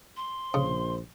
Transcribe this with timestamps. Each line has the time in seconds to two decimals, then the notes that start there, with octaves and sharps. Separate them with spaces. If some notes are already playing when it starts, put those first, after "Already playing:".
0.17 C6
0.54 A#1 C#3 C5